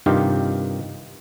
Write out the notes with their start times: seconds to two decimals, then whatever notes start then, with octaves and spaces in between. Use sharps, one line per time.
0.06 G2 C3 D#3 D#4 F4 G4